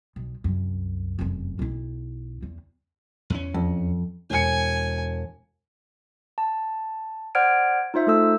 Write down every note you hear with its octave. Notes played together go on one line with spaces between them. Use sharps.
B1
C2 F#2
F1 F#2
B1 E4
E2
E2 C#4
F2
E1 G#5 C#7
A5
C5 D5 F#5 F6 G#6 D7
D#4 F4 C5 E5
A3 A4 E6